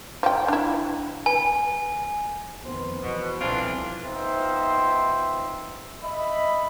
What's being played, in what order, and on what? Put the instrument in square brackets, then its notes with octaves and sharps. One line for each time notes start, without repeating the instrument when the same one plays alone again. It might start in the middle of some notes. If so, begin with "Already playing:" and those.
[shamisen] F3 G5
D4 E4
[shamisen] B4 [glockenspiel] G#5
[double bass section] F2 D#3 B3 [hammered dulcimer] C5
[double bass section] E2 [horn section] B2
[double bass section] C2 B2 F3 [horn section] E3 D4 [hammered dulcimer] C4 A4 [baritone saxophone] F4
[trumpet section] B3 D#4 F4 C5 E5 G5
D#5 E5 B5